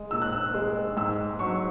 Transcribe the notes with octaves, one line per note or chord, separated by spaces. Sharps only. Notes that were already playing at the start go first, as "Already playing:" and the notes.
Already playing: G#3
A#2 E6
F#6
E6
G#3
G#2 E6
F#3 C#6